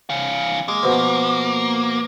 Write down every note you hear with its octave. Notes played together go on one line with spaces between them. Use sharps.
E3 F5
G#3 A#3
B2 F3